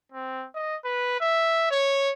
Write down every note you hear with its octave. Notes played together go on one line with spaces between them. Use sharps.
C4
D#5
B4
E5
C#5